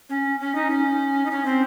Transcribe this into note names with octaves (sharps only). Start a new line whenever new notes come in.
C#4
C#4
D#4
C#4
D#4
C#4
C4